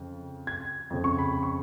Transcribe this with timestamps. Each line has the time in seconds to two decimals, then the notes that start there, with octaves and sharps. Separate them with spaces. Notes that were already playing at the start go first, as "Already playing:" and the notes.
Already playing: F2 C#3
0.47 G#6
0.90 F2 C#3
1.04 C#6
1.19 B5
1.33 B5
1.43 C#6